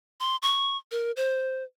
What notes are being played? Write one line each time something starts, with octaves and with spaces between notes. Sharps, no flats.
C6
C#6
A#4
C5